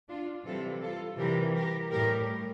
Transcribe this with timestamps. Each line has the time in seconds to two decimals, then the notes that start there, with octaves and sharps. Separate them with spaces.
0.09 D4 F4
0.46 C3 E3 G3 F4 A4
0.82 F4 A4
1.19 C3 E3 G3 G4 A#4
1.55 G4 A#4
1.92 A2 G3 G4 A#4